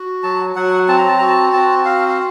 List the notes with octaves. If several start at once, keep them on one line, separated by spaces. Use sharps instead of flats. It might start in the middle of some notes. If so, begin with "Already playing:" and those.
Already playing: F#4
F#3 A5
F#3 F#5
C4 A5
A#5
A5
F#4 A#5
A5
C4 A5
F#4 F5
F5